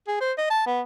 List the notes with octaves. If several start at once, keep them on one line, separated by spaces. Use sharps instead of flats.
G#4
C5
D#5
A5
B3